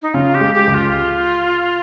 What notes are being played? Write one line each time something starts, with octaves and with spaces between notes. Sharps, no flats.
D#4
C#3 F4
G4
G#3
G4
C#2
F4